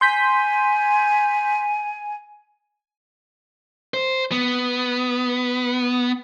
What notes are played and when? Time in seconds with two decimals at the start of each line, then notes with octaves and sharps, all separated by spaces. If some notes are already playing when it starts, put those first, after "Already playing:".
0.01 G#5 C6 G6 B6
3.94 C5
4.32 B3